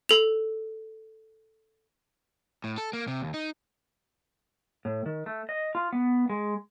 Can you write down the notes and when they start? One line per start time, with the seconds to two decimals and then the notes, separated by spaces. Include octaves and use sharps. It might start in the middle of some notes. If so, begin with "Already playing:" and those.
0.09 A4 F7
2.64 A2
2.78 A4
2.93 A#3
3.08 C3
3.21 D#2
3.34 D#4
4.85 A2
5.06 D#3
5.26 A3
5.49 D#5
5.75 F4
5.93 B3
6.30 G#3